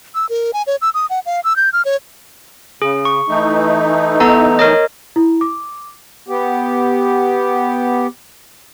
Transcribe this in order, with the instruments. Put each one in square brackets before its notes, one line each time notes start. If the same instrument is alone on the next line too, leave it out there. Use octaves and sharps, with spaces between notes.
[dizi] E6
A#4
G#5
C#5
E6
D#6
F#5
F5
E6
G6
F6
C#5
[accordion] C#3 [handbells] G#4
[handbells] C#6
[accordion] E3 A3 D#4
[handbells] B3 A4 A#5
A#4 C#5 D#5
[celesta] E4
D6
[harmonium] B3 G4